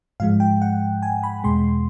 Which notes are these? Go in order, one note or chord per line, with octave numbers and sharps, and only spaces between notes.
G#2 F3 G#3 F5
G5
F#5
G#5
B5
E2 B2 G#3 C6